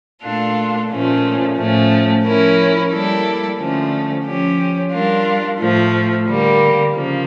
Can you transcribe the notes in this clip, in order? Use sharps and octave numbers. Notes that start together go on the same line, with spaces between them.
A#2 A3 D4 F4 A4
A#2 F3 A3 C#4
A2 F3 A3 C#4
F3 C#4 E4 A#4
G3 A#3 E4 A4 D5
D3 F3 A3 C#4
F3 C#4 G4
G3 D4 F4 A#4
A2 F3 A3
D3 G3 A#3
C#3 F3 A#3